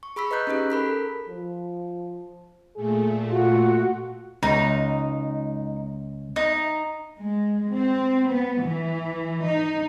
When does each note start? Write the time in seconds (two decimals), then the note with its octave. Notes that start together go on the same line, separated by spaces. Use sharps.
0.03 C#6
0.16 G#4 B5 C#6 E6 B6
0.31 B4 D#5 A#5 F#6 G6 B6
0.47 C#4 D#4 G4 G#4 F#6
0.70 A4 A#4 B5 B6
1.29 F3
2.76 A#2 A3 G#4
3.30 F4 F#4
4.43 C#2 D#4
6.36 D#4
7.19 G#3
7.73 C4
8.28 B3
8.62 E3
9.43 D#4